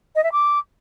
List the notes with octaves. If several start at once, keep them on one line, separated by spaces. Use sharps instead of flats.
D#5
E5
D6